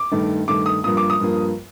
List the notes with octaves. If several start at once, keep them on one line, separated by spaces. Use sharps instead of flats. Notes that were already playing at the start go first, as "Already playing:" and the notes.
Already playing: D6
G2 D#3 A3
G2 D#3 A3 D6
D#6
G2 F3 A#3 D#6
D6
D#6
G2 F3 A#3